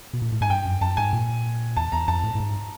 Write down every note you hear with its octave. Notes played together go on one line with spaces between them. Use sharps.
B2
A#2
A2
G#2 G#5
G2 G5
F#2
F#2 A5
G#2 G#5
A#2
E2 A5
E2 A#5
F2 A5
A2
A2
G#2